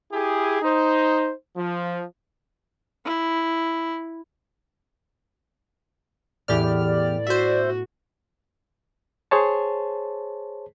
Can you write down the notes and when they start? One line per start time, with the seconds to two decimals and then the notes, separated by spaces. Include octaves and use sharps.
0.13 E4 G4 G#4
0.62 D#4 C5
1.56 F3
3.05 E4
6.48 E2 A2 B3 G4 D5 F6
7.27 F#4 C5 E5
9.31 G#4 C5 C#5 A5